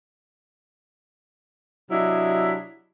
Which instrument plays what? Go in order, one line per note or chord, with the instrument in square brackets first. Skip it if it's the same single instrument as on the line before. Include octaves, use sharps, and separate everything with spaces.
[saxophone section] C3 F#3 D4 E4 D#5 E5